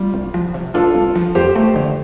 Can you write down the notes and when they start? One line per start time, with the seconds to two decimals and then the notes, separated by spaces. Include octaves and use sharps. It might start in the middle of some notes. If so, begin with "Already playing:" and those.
Already playing: G3 F4
0.14 C2
0.34 F3
0.54 C3
0.74 D4 F4 A4
0.95 C2
1.15 F3
1.35 F2 G4 C5
1.56 A3
1.76 D3